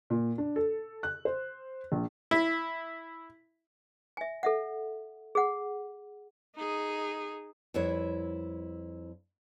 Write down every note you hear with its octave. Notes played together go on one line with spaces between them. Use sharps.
A#2
D4
A4
F#6
C5
A#1
E4
E5 G#5
A4 E5 F#5
G#4 F#5
D#4 G#4
F2 G3 E4 B4 C#5